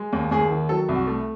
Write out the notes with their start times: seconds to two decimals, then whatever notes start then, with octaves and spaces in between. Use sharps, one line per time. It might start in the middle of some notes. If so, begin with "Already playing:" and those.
Already playing: G#3
0.13 D#2
0.31 D#2 G#4
0.50 D#3
0.69 F#3 A4
0.89 C2
0.95 F#4
1.07 A3